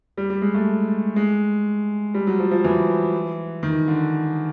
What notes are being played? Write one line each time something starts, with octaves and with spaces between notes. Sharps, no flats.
G3
G3
G#3
A3
G#3
G3
F#3
F3
F3
E3
D#3
D3